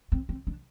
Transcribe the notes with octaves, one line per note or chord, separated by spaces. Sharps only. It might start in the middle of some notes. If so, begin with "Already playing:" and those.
C4
C4
D4